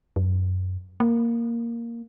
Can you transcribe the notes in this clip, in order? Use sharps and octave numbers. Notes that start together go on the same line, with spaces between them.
F#2
A#3